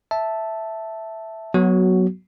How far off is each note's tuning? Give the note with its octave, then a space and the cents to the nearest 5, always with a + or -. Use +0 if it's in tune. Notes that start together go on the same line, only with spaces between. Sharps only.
E5 -5 A5 +0
F#3 +0 B3 -15 F#4 +10